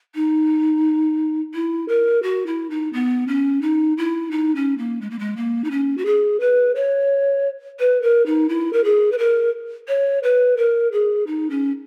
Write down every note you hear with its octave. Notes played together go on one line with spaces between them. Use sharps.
D#4
E4
A#4
F#4
E4
D#4
B3
C#4
D#4
E4
D#4
C#4
A#3
G#3
A#3
G#3
A#3
D#4
C#4
F#4
G#4
B4
C#5
B4
A#4
D#4
E4
A#4
G#4
B4
A#4
C#5
B4
A#4
G#4
D#4
C#4